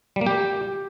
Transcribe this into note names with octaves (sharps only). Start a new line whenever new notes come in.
G3
A#3
G4